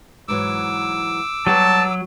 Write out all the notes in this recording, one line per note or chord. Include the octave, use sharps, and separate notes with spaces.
G#2 E3 F#3 D6 E6
F#3 G3 B3 G4 A5